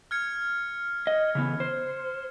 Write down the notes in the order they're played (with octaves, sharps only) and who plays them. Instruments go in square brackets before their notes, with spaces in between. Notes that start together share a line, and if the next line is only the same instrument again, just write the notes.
[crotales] F6 G#6 C#7
[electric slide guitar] D#5
C#3 E3 B3
C5